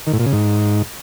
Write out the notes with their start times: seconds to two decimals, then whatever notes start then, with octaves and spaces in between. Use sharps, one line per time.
0.07 D#3
0.13 A2
0.20 A#2
0.26 C#3
0.33 G#2